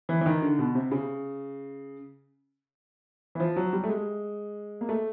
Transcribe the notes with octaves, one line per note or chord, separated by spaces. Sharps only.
E3
E3
D#3
D3
B2
C3
C#3
E3
F3
F#3
G3
A3
G#3
A#3
A3